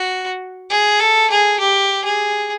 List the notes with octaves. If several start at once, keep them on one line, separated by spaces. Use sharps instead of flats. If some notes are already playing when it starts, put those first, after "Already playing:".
Already playing: F#4
G#4
A4
G#4
G4
G#4